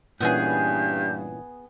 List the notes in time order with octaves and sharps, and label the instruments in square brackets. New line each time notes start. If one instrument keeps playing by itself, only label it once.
[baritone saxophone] G2 [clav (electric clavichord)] A#2 E3 C#4 [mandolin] B3 F4 G#4 [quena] G6